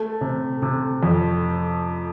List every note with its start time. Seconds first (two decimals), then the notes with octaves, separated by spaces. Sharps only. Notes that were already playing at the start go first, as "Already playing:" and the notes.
Already playing: A3
0.21 C3
0.62 C3
1.03 F2